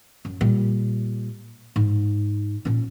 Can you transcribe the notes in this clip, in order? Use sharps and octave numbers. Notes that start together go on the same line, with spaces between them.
F#2
A#2 G3
G#2
A#2 C#4